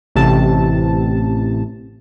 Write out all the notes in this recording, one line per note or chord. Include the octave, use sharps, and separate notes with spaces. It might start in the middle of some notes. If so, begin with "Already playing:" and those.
A1 C3 A5